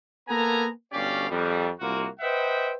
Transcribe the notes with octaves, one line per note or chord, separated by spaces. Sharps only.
A#3 B3 A4 G#5 A#5
G1 B2 C#4 G4 D5 F5
F2 G3
C2 A#3 F4 F#4
B4 C5 D#5 E5 F#5 G5